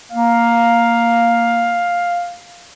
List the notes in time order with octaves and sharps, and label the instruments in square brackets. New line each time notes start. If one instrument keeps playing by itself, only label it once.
[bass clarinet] A#3 [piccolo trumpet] F5